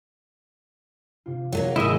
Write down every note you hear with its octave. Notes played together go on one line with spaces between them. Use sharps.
C3 F4
F#3 A3 A#3
G#1 D#3 G#3 E4 D#5 E5